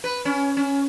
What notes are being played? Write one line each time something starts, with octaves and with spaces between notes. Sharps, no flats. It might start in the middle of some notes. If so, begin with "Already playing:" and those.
B4
C#4
C#4